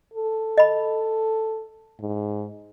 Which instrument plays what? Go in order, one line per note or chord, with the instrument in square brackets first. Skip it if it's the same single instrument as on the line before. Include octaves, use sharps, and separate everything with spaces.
[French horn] A4
[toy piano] D#5 B5
[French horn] G#2